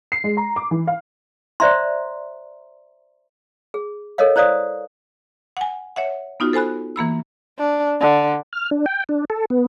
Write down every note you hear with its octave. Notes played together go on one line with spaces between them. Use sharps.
C7
G#3
A#5
D6
E3
F5
C5 D5 E5 A#5 C6
G#4
A4 A#4 C#5 D#5 F5
E4 C5 D5 F5 D#6
F#5 G#5
C#5 E5 F#5
B3 D#4 F4 F#4
A4 C5 G#5 B5 F#6
E3 A#3 B5 E6
D4
D3
F6
D4
G5
D4
A4
B3